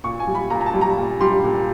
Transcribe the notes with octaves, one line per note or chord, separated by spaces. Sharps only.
A#2 C#6
G#5
G3
B5
A#2 A#5
A#5
A5
G3
A#5
A#2
G3 C6
A#2